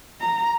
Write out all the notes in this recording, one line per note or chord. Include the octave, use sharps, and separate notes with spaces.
A#5